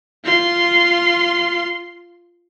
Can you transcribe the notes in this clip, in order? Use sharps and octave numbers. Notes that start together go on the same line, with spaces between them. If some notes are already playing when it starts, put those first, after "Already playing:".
F4 C6